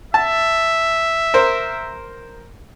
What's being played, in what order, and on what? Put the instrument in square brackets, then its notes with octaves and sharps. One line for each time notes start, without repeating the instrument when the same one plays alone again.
[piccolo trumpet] E5 [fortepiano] A5
[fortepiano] A#4 C5